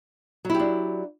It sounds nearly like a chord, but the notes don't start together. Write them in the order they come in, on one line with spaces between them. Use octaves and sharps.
F#3 E4 G4 D4